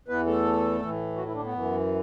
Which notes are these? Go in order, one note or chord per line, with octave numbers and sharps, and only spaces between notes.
E2 E3 B3 B4
A3 A4
A2 E3
F#3 F#4
E3 E4
D3 D4
B3
F#2 E3